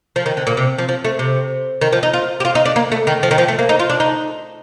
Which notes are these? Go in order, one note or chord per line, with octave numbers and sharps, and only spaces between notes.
F3
D#3
D3
A#2
C3
F3
F3
A3
C3
D#3
F3
D#4
F4
G4
F4
D#4
D4
A#3
A3
D#3
F3
D#3
F3
A3
A#3
D#4
F4
D4
D#4